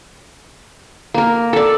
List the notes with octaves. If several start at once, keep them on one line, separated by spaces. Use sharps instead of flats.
A#3 A#4
A4 D5